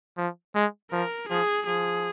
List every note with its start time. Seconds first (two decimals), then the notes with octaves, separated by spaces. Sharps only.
0.17 F3
0.55 G#3
0.91 F3 A#4
1.29 F3 G#4
1.66 F3 G#4